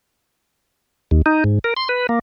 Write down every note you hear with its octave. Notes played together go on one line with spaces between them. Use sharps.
D#2
D#4
G#2
A#4
C6
B4
A#3